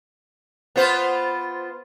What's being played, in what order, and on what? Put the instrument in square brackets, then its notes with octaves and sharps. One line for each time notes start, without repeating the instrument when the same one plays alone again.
[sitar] B3 F4 C5